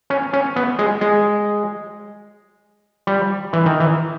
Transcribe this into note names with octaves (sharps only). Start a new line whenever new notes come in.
C#4
C#4
B3
G#3
G#3
G3
E3
D#3
E3